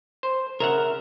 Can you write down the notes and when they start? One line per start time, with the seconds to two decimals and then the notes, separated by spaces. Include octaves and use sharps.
0.23 C5
0.60 C#3 A#4 E5 F#5